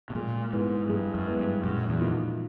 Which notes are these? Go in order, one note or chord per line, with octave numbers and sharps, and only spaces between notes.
B2
A#2 G#3
G#2 B3 E4
G2 G#3
F#2
B3 E4
G2
F#2 A#2
E2
F3 A#3 D#4 F#4